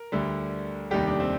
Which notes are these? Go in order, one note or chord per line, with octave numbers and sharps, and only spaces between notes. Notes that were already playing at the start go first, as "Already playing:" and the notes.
Already playing: A#4
D2 D3 G3
F1 D#2 D#3 G3 G4
D4
C4